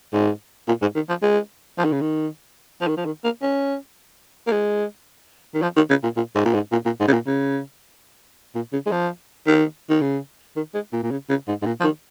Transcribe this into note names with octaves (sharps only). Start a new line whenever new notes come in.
G#2
A#2
G#2
D#3
F3
G#3
F3
D#3
C#3
D#3
F3
D#3
F3
D#3
A#3
C#4
A#3
G#3
D#3
F3
D#3
C#3
A#2
A#2
G#2
A#2
G#2
A#2
A#2
G#2
C#3
A#2
C#3
A#2
C#3
G#3
F3
D#3
D#3
C#3
D#3
G#3
A#2
A#2
C#3
C#3
G#2
G#2
A#2
F3
D#3